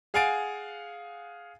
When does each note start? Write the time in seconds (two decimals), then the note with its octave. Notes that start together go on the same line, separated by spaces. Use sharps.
0.14 G#4 F5 F#5 G#5 A6 D7